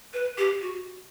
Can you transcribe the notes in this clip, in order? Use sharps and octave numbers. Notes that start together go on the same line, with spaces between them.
B4
G4
F#4